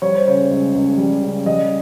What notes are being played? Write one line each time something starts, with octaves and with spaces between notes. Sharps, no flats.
G3 C#5
C5
C#3 C#5
C#2
C#2
G3
C#3
G3 D#5